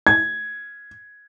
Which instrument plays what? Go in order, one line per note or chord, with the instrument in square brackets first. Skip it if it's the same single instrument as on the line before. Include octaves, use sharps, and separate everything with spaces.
[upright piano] G#6